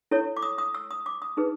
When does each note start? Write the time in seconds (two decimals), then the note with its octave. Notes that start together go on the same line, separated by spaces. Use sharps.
0.11 E4 A4 C#5
0.37 D6
0.42 D#6
0.58 D#6
0.74 E6
0.91 D#6
1.06 D6
1.22 D#6
1.37 D#4 G#4 B4